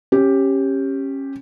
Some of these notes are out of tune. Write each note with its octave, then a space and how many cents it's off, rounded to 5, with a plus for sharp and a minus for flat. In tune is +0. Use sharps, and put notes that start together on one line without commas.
C#4 -20 G4 +0